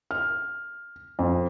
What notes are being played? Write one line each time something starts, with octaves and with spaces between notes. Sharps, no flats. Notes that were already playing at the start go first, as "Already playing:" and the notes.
F6
F2